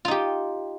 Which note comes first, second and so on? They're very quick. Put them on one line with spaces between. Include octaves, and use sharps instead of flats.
F4 D#4 G4